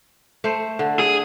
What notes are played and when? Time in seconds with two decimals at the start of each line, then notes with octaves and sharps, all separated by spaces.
0.44 A3 C5
0.79 D3
0.99 G#4